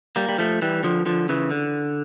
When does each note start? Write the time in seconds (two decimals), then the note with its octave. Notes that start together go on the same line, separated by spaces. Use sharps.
0.16 G3 A#3
0.29 G3
0.38 F3 A3
0.62 E3 G3
0.84 D3 F3
1.06 D3 F3
1.29 C#3 E3
1.51 D3